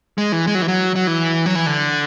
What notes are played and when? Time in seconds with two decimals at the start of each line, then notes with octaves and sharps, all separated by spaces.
0.18 G#3
0.32 E3
0.47 G#3
0.55 F#3
0.62 E3
0.68 F#3
0.96 F#3
1.07 E3
1.46 F#3
1.55 E3
1.66 D3